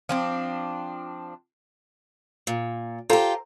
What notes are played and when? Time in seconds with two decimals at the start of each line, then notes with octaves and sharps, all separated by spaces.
0.09 F3 C4 D4
2.47 A#2
3.10 F4 G4 A4 C5 A#5